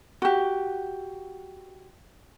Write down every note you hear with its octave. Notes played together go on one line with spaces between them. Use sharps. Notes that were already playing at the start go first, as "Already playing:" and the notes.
F#4 G4